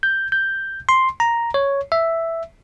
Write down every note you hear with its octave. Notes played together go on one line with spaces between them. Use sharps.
G6
G6
C6
A#5
C#5
E5